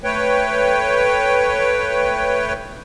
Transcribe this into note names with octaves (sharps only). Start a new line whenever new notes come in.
A3 B4 C#5 G5